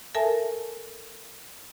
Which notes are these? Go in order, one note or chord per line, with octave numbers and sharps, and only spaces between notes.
A4 A#4 E5 G#5 A5